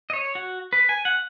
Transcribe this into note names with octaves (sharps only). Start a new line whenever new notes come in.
D#5
C#5
F#4
B4
G#5
F#5